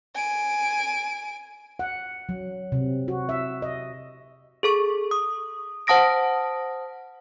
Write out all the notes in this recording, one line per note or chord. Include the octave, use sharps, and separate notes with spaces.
G#5 D7
F#5
F#3
C3
F#4
E5
D#5
G#4 A4 C#6
D#6
C5 F#5 A5 D#6 A#6 D7